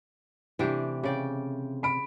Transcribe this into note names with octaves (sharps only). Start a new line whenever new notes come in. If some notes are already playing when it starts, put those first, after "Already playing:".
C3 E3 A3 D4 G4
C#3 D5 G5
B5 D7